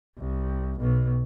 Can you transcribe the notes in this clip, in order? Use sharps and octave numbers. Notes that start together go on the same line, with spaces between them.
C2
B1 B2